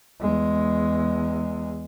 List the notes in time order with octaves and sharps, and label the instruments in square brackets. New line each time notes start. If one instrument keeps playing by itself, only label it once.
[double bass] E2 G#3